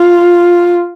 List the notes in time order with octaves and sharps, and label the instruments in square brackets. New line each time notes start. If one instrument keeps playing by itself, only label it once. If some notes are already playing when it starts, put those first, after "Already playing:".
Already playing: [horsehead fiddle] F4